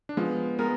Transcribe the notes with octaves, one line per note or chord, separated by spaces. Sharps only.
D4
F3 G#3 B3
G#3 B3 A#4